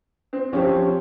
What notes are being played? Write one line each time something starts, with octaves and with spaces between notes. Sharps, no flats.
C4
F3 C4 C#4 G4 C5